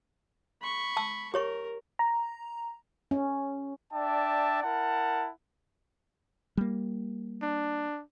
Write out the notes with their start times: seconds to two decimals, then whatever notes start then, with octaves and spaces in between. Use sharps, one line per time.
0.61 B5 C#6
0.97 A5 E6
1.34 G4 A#4 C#5 C#6
1.99 A#5
3.11 C#4
3.93 D4 D5 E5 G5 A5
4.63 E4 A#4 F#5 A5
6.57 G3 A#3
7.42 D4